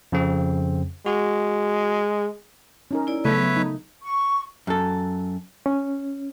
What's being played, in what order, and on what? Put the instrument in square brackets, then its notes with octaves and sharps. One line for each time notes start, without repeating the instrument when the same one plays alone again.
[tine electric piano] F2 C#3 C4
[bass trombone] G#3 [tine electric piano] F#4
[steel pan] C#4 D#4 A#4
[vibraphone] E4 D5
[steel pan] C#3 A3 A4 [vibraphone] F#3 B3 [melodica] B4 C#5 E5
[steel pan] D#4
[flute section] C#6
[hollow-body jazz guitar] F#2 A4
[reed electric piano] C#4